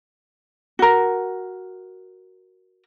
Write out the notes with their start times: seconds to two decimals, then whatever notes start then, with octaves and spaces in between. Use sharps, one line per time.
0.79 F#4 A#4